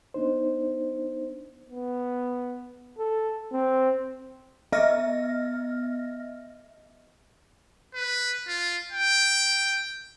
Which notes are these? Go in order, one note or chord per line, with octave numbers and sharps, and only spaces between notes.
B3 D4 D#4 C5
B3
A4
C4
B3 D#5 E5 F6 A#6
B4
F4
G5